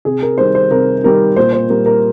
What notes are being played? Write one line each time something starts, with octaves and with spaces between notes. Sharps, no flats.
C3 G#4
A#4
D#3 G3 C5
C5
C3 A#4
D#3 G3 A#4
A#2 C5
C5
G3 A#4
A#4